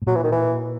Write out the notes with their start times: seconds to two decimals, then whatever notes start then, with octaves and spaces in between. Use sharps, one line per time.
0.02 A2
0.06 A#2 F#3
0.15 E3
0.24 D#3
0.32 E3